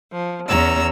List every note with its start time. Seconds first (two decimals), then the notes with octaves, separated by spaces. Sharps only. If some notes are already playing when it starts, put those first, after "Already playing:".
0.12 F3
0.48 E2 C#4 A#5 E6